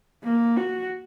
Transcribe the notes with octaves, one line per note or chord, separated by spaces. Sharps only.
A#3
F#4